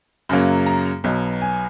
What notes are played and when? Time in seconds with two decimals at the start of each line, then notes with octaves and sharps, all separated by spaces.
0.29 F#2 C#3 F#3 A#3
0.66 A#5
1.04 B1 B2 F#3
1.42 G#5